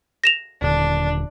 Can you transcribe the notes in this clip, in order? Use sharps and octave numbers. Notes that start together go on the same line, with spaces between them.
A#6 E7 F7
D#1 D3 D4